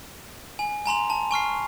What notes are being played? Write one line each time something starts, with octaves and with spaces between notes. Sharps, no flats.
G#5
G#5 A#5 C6 F7
A5
G#5 C#6 F6 C7